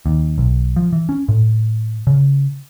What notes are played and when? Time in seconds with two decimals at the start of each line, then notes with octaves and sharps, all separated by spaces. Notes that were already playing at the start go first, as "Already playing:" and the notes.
0.06 D#2
0.38 B1
0.76 F3
0.93 E3
1.09 C#4
1.28 A2
2.07 C#3